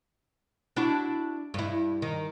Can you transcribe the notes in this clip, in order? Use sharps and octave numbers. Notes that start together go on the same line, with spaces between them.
D4 E4 F#4
G2 E4
D#3